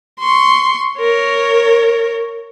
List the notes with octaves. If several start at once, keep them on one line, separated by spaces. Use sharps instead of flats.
C6 C#6
A#4 C#5